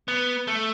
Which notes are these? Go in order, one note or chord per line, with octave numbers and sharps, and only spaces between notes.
B3
A3